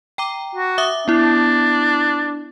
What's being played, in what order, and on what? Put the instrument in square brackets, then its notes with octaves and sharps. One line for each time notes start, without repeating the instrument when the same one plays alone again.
[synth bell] G5 A#5 D6
[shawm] F#4
[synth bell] E5 D6 D#6
[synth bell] B3 E4 [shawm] D4